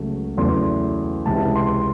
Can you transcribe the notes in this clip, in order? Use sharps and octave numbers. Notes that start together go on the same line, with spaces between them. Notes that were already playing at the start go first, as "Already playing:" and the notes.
Already playing: C#2 C#3 F#3 A3
E2 C#3 F#3 A3 C6
C#2 C3 E3 A5
C6